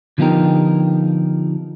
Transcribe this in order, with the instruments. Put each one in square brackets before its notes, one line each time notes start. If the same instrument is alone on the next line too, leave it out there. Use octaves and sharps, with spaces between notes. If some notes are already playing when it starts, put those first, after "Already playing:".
[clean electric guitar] D3 F3 B3 D#4 G4 A#4